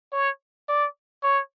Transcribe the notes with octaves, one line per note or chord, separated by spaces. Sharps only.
C#5
D5
C#5